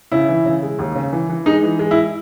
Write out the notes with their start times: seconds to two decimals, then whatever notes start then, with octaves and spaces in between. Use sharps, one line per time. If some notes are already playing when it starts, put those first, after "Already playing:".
0.12 C#3 E4
0.29 E3
0.46 C#3
0.62 G#3
0.79 D#2
0.96 C#3
1.13 E3
1.29 E3
1.46 G#3 D#4
1.63 E3
1.79 G#3
1.91 E4